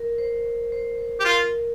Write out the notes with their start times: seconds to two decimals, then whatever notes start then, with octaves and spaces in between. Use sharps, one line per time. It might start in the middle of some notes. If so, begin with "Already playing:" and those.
Already playing: A#4
0.18 C5
0.72 C5
0.98 C5
1.20 G4
1.24 F4 A#4